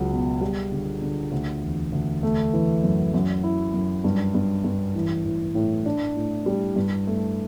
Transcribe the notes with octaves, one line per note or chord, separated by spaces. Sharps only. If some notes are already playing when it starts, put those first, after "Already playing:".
Already playing: C#2 F#3
B2
G3
D3
D3
D2
E1
D2
A3
E3
F#2
F#2
E4
F#2
G2
G2
G2
A1
A1
A2
D4
A2
G3
G2
A3